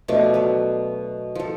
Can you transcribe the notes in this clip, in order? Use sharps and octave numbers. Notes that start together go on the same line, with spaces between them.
B2 F3 A3 D4
F#3 B4
F3 A4